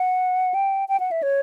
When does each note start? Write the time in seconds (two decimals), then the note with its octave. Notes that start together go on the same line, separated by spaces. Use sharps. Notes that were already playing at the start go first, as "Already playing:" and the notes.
Already playing: F#5
0.54 G5
0.89 G5
1.00 F#5
1.11 E5
1.23 C#5